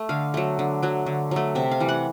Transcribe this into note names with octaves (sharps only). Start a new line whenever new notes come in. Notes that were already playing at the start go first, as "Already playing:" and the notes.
Already playing: A3
D3 F5
F#3 A3
D3
F#3 A3
D3
F#3 A3
C3 E5
F5
E3 G3
F#5